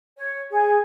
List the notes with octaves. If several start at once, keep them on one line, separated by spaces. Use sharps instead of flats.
C#5
G#4